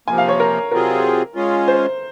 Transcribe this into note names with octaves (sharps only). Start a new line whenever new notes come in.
C3 F3 A#3 G#5
F5
C#5
A#4
C3 F#3 C4 F4 G#4 A#4
G#3 C#4 F4
C5